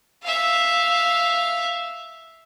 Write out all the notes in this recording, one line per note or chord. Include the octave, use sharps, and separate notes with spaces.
E5 F5